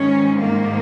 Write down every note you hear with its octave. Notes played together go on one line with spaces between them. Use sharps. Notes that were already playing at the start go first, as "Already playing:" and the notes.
Already playing: G#2 D#3 C#4
A#3